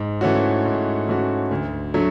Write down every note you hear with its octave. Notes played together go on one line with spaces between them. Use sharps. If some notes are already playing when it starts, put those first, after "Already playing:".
Already playing: G#2
E3 A3 C#4 F#4
G#2
E3 A3 C#4 F#4
D2
D3 F#3 A3